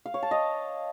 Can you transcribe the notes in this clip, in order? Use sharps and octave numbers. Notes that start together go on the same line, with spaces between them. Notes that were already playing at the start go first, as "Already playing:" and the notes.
F5
C#5
A5
D#5